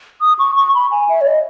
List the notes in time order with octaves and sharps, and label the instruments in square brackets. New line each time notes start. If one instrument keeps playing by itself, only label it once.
[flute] D#6
C#6
C#6
B5
G#5
E5
C#5
D#5